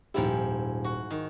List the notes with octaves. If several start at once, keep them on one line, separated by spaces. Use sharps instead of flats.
D#1 G#2 F3 E4 G4
F#4
D#3